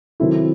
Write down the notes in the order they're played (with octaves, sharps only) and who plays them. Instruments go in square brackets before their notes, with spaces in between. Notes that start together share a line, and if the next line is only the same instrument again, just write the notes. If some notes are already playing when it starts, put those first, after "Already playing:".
[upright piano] D#3 F#3 C4 E4 A4